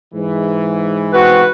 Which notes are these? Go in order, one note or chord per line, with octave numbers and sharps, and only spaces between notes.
G#2 E3
C4 F#4 B4